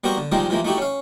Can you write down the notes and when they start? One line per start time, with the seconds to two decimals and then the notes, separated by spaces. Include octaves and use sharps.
0.04 G3 A#3 B3 F#4 A#4 C5
0.17 D3
0.32 D#3 F3 G3 G#3 A#3 D#4
0.49 C3 E3 F3 G#3 A#3
0.65 A3 D#4 E4 F#4 G4
0.78 C#4 F5